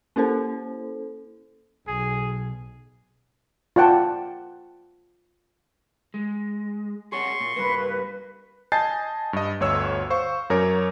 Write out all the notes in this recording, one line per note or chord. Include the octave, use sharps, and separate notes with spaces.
A#3 C#4 E4 A4 C5
B1 G#4
F4 D5 F#5 G5 A5
G#3
G#4 C#5 F#5 C6 C#6
A#2
G2 A#3 B4
D#5 G#5 A5 G6 A6 C7
G2 D#5
G1 D2 C#5 E6
C5 F5 C#6
F#2 A#4 C#5 D6